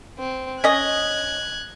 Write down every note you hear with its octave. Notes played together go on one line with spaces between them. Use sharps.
C4
C#4 D#5 F#6 G#6